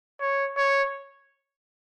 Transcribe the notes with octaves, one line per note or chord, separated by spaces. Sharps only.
C#5
C#5